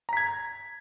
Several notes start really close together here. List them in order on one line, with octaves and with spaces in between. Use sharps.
A#5 B6 G#6